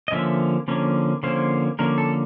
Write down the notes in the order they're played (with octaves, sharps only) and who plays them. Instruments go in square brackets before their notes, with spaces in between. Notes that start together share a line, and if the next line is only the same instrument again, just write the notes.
[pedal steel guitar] D#5
D3 F3 A#3 C#4 E5
D3 F3 A#3 C#4
D3 F3 A#3 C#4 C5
D3 F3 A#3 C#4 A#4
A4